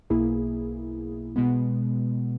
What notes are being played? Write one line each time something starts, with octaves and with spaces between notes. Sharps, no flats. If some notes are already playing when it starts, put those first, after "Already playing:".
B1 B2 A#3 E4 G#4
B2 G#3 B3